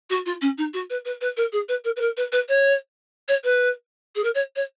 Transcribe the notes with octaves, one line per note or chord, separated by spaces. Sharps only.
F#4
F4
C#4
D#4
F#4
B4
B4
B4
A#4
G#4
B4
A#4
B4
A#4
B4
B4
C#5
C#5
B4
G#4
A#4
C#5
C#5